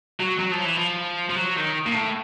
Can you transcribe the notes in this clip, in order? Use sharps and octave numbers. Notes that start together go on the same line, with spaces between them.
F#3
F#3
F3
E3
F3
F3
F#3
D#3
A#2
A2